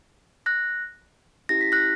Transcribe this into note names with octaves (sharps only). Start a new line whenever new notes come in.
F#6 A#6
C#4 E4 G4 A#6
B6
F#6 A#6